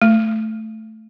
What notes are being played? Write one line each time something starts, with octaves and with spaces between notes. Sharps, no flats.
A3